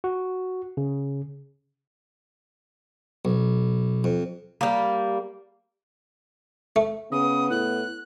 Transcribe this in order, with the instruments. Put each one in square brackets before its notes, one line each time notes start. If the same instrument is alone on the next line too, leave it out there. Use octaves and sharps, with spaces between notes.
[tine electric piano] F#4
C#3
[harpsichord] B1
F2
[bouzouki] G3 A#3
[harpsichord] A3
[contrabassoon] C#3 [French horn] B3 [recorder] D#6
[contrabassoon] A2 [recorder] F#6